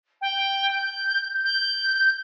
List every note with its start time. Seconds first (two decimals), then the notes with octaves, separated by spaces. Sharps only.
0.21 G5
0.71 G6
1.44 G6